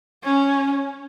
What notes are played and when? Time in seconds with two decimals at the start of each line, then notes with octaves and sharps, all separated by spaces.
0.24 C#4